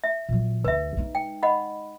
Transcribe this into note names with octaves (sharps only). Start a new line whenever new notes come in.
E5
A#2 F#3
D2 B4 E5
G#3 D#4
G5
D#5 F#5 B5